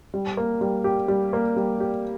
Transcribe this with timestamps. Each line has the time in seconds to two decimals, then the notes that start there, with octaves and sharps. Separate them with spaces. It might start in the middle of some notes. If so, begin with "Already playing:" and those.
0.14 G3
0.37 A#3
0.61 G3
0.84 G4
1.08 G3
1.33 A#3
1.56 G3
1.80 G4